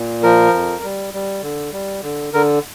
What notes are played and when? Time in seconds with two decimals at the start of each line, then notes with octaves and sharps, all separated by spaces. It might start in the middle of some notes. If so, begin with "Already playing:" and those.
Already playing: A#2
0.23 F3 A#4
0.54 F2
0.83 G3
1.14 G3
1.43 D3
1.73 G3
2.03 D3
2.33 D3 A#4